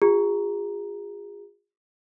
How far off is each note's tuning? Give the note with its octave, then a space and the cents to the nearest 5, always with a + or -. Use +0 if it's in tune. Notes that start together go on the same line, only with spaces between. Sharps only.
F4 +25 G#4 -30 A#5 +0